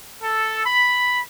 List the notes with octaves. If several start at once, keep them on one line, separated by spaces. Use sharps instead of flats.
A4
B5